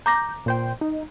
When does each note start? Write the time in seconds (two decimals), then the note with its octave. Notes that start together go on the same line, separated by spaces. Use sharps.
0.06 A#5 D6 G6 A#6
0.46 A#2 C5 G5
0.81 D#4